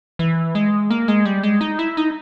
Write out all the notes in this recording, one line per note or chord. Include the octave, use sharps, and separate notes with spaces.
E3
G#3
A#3
G#3
G3
G#3
D#4
E4
D#4